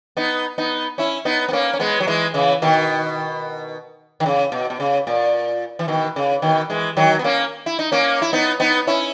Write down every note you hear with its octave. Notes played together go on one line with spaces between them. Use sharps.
B3 D#4
B3 D#4
C#4 E4
B3 D#4
B3
A#3 C#4
C#4
G#3 B3
F#3
E3 G#3
C#3 E3
B2 D#3
D#3
C#3
B2
B2
C#3
A#2
E3
B2 D#3
C#3
B2 D#3
E3 G#3
D#3 F#3
B3
A#3 C#4
E4
D#4
A#3 C#4
E4
B3 D#4
B3 D#4
C#4 E4